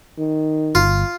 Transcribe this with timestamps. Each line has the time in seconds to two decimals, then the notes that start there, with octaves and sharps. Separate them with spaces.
0.18 D#3
0.75 G1 F4